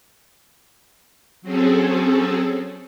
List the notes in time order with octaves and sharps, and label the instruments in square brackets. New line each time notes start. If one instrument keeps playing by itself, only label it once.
[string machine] F#3 C4 C#4 G#4 A4